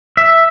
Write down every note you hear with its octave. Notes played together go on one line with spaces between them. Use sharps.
E5